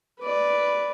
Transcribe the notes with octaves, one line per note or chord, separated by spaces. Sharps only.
B4 D5